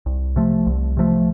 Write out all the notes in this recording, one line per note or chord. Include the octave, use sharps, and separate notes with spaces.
C2
C3 F3 A3
C2
C3 F3 A3